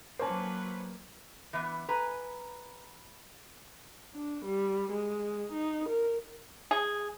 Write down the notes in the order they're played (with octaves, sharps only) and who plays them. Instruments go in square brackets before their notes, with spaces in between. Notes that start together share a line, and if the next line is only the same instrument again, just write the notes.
[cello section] F#3 B4 [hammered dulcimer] A#3 C#4 [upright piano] C5 A5
[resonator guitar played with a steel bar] E3 B3
B4 G#5 A#5
[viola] D4
G3
G#3
D#4
A#4
[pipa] G#4